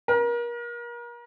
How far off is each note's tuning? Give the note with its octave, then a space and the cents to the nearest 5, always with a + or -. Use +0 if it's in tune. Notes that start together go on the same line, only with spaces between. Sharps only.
A#4 +35